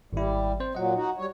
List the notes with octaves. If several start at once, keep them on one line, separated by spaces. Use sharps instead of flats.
G#1 G3 E4
C4 C5
A#2 F#3 D#5 F#5
D#4 F#4
G3 C#5